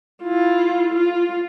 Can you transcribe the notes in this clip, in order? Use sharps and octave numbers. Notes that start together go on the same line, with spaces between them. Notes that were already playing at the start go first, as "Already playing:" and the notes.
E4 F4
F4